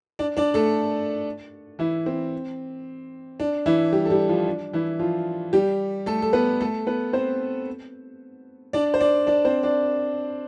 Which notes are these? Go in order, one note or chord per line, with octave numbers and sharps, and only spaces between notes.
D4 D5
D4 D5
A3 A4
E3 E4
C4
D4
E3 E4
G3 G4
A4
G3 G4
F3 F4
D4
E3 E4
F3 F4
G3 G4
A3 A4
A4
B3 B4
A3 A4
B3 B4
C4 C5
D4 D5
C5
D4 D5
D4 D5
C4 C5
D4 D5